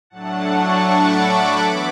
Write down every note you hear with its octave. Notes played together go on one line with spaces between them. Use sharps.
A2 F#3 A3 D4 F#5 A5
A5 C#6
B5 D6
E3 B3 E4 B5 D6